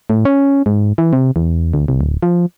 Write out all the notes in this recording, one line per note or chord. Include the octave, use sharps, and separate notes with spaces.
A2
C#4
G#2
E3
C3
E2
D2
C2
D1
F3